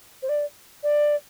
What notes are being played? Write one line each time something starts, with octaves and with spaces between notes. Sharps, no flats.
C5
D5
D5